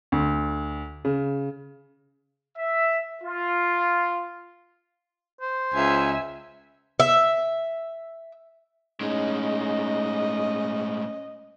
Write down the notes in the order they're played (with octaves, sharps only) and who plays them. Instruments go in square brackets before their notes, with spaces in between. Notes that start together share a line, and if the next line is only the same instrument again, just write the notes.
[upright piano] D2
C#3
[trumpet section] E5
F4
[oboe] C5
[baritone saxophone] C#2 [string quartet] E5 G#5
[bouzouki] E5
[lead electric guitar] A2 G#3 [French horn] C#4 [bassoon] D#4 [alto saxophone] D#5